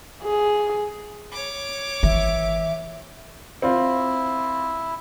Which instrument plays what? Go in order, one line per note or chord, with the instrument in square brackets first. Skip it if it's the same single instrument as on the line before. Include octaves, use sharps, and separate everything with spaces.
[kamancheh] G#4
[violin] C#5 D6
[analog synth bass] G#1 [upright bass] E3 [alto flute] E5
[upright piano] C4 F4 [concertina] E4